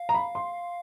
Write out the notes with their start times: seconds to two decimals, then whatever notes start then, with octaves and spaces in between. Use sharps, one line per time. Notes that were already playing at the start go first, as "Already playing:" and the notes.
Already playing: F5
0.09 A#5
0.14 B5
0.35 C6